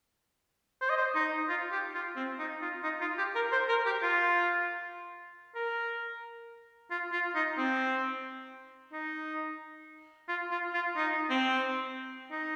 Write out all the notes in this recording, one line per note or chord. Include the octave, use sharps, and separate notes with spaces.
C5
D#5
C5
D#4
F4
G4
F4
C4
D#4
F4
D#4
F4
G4
A#4
C5
A#4
G4
F4
A#4
F4
F4
D#4
C4
D#4
F4
F4
F4
D#4
C4
D#4